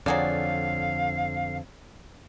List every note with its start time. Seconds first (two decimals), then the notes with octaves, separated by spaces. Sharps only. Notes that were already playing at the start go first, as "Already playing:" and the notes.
0.06 F2 D3 F#3 G#4 D5 F5